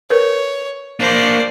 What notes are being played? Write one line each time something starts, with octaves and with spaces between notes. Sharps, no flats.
A#4 B4 C#5
A#3 D4 C5 D5